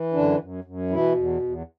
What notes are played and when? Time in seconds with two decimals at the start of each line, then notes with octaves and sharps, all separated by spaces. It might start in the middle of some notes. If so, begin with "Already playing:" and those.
Already playing: E3
0.13 F#2 D3 D4
0.39 F#2
0.64 F#2
0.90 B2 E3 E4
1.15 E2
1.42 E2